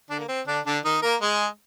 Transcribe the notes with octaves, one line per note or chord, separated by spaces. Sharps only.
D3 D4
A#3
C4
D3 D4
D3 D4
D#3 D#4
A#3 A#4
G#3 G#4